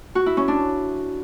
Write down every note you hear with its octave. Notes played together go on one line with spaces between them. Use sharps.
F#4
E4
C#4
D4